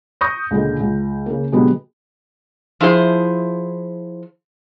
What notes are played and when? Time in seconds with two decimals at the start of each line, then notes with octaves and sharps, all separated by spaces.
0.21 C#6 D#6 G6 A#6
0.51 C#2 A#2 D3 G#3
0.80 C#2
1.26 C#3 A#3
1.52 B2 D3 F#3 G#3 B3 G4
2.81 F3 E4 G#4 C5